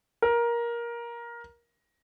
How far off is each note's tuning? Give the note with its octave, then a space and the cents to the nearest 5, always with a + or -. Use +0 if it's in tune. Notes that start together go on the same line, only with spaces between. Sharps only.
A#4 +15